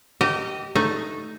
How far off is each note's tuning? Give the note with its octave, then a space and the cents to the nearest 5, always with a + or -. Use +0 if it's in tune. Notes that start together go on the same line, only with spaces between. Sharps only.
G4 -25 A#4 -30 D#5 +0
A3 +0 D#4 +0